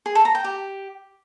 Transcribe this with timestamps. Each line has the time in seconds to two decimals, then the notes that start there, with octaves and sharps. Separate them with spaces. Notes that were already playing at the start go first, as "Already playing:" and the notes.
0.06 G#4
0.15 A4
0.25 A#5
0.35 G5
0.44 G4